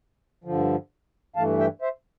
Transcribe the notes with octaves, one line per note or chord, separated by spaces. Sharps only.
G2 D3 F3
G2 E3 A3 F5 A5
E5 G5
C5 E5